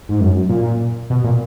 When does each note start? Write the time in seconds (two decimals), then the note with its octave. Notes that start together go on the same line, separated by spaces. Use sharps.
0.09 G#2
0.20 F#2
0.49 A#2
1.10 B2
1.24 A#2